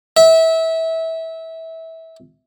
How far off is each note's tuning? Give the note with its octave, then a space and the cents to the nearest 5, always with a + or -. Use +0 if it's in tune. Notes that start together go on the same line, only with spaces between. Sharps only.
E5 -20